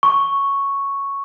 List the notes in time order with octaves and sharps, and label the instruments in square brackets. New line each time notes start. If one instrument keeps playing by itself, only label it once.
[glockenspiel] C#6